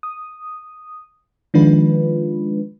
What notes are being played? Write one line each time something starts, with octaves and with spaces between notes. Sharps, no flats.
D#6
D#3 F3 G#3 D4 F4 B4